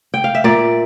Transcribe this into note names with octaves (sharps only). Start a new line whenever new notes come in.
G5
F5
E5
A#2 D5